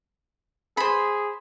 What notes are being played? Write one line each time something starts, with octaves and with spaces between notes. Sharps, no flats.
G#4 C5 B5